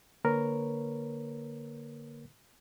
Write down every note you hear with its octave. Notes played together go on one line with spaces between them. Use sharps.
D3 A#3 A#4 B4 C#5